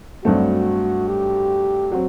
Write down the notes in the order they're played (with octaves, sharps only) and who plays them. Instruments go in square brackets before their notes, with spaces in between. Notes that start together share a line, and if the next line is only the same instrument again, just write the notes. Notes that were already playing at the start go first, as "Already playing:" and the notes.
[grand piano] G2 F#3 A3 C4 [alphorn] F#4
[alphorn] G4
[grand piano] F#3 C4